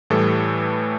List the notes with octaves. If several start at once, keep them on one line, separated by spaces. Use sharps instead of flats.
A2 E3 G3 A4